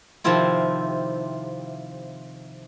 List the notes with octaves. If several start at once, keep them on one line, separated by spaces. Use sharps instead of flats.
C3 D#3 F3 C4 E4 F4